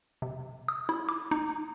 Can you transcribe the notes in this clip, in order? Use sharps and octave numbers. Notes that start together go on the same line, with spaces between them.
C3
D#6
E4
D6
D#4